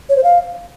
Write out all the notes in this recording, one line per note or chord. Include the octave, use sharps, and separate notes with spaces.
C#5
C5
F5